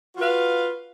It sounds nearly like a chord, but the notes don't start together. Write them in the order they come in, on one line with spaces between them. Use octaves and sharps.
F#4 F4 B4 F5